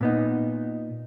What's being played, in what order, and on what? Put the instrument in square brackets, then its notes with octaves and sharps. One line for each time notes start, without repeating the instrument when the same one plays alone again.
[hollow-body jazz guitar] A#2 B3 D#4